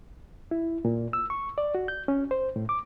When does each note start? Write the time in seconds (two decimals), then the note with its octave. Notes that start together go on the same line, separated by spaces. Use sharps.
0.51 E4
0.85 A#2
1.13 E6
1.30 C#6
1.58 D5
1.75 F#4
1.88 G6
2.08 C#4
2.31 C5
2.56 A2
2.69 D6